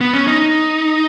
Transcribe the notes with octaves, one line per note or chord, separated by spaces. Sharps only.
B3
C#4
D#4